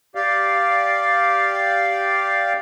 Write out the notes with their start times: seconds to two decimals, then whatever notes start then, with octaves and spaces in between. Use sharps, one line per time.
0.15 G4 D5 F5